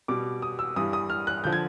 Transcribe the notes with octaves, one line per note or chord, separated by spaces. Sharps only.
B2 G3 D6
D#6
E6
G2 E3 G3 D#6
D#6
F6
F#6
D3 F3 G6
G#6